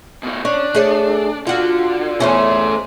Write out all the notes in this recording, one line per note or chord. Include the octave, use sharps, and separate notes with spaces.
B2 A3
C#4 D4
A3 G#4 C#5
D3 F4 F#4
E2 A3 C#4 G#4 C5